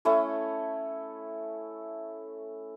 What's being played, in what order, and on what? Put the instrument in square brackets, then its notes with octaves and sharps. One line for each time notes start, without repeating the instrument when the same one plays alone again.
[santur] A3 C#4 E4 A4